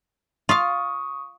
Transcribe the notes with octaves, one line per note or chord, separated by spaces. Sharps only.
F4 F5 C#6 D#6